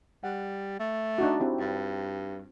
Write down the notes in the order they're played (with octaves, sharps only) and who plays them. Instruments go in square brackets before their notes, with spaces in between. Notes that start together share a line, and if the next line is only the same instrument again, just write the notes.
[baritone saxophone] G3 [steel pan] F#5
[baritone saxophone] A3
[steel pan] D4 D#4 F#4
C4 E4 G4
[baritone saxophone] G2